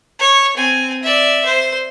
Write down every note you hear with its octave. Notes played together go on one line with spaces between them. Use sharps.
C#5 C#6
C4 G#5
D5 E5
C5